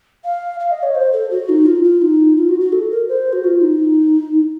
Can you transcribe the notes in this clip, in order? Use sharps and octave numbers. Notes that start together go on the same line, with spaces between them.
F5
F5
D#5
C#5
C5
A4
F#4
D#4
F4
F4
D#4
F4
F#4
F#4
A4
A#4
C5
F#4
F4
D#4